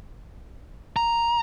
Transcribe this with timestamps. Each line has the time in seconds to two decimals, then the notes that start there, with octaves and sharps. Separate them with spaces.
0.96 A#5